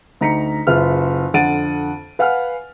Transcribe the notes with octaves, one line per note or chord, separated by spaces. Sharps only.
D2 D#4 A#5 B6 C#7
F#1 F4 B4 E5 F6
F2 D3 F#5 A6 D7 D#7
B4 F5 F#5 G#5 F6